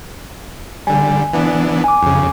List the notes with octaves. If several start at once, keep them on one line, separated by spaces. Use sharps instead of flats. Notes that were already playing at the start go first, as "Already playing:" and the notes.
D3 G3 G#5
E3 B3 D4
G#5 D6
F2 C#3